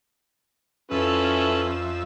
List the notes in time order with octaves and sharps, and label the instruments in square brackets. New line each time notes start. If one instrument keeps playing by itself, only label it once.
[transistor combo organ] F2 E5 [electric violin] C#4 [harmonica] E4 A4 B4